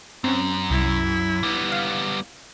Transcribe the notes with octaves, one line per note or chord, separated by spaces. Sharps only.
F#2 C4 C#4
C2 E4
G3 B3
F5